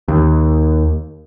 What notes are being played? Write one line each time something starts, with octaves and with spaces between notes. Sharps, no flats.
D#2